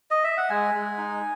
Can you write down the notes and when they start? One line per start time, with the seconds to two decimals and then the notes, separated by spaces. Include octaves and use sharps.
0.11 D#5
0.24 E5
0.37 F#5
0.50 G#3 G#5
0.74 G#3
0.98 D#4